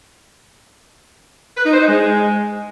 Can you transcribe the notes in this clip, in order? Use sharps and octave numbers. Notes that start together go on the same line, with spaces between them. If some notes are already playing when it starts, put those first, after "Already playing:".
B4
D#4
C5
D#4
G#3